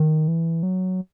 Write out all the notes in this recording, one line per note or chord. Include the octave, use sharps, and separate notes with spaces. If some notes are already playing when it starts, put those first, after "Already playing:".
Already playing: D#3
E3
F#3